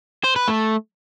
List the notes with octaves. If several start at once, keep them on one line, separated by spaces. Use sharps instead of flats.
C5
B4
A3